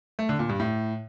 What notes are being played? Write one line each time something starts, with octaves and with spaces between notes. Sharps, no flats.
A3
D3
A#2
G2
A2